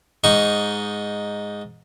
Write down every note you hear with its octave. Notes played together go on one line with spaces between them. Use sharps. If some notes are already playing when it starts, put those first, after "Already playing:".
G#2 D#4 C#6